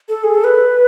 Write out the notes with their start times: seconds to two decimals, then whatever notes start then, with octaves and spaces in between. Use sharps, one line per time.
0.09 A4
0.24 G#4
0.34 A4
0.44 B4